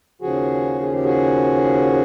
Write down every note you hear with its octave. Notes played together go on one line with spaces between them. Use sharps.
D#2 C#3 F3 F#4 G#4
G#4
G4
F#4 G#4